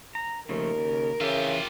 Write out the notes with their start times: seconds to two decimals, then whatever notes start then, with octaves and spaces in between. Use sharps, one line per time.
0.15 A#5
0.49 D#2 C#3 F3 A3 A#4
0.78 C#3
1.20 C#3 E3 F4 G4 E5